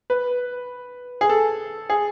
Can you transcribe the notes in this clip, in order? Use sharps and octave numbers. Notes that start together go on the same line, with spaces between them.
B4
G#4
A4
G#4